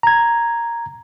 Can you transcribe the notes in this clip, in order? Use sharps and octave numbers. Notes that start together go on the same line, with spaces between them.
A#5 G#6